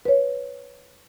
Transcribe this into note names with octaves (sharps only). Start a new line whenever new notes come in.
B4 C#5